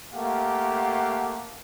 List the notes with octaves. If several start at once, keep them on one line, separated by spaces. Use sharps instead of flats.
A3 A#3 G4 F5 F#5